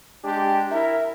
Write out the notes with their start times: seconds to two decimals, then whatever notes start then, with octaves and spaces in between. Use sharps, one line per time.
0.24 G#3 D4 G4
0.71 E4 A#4 E5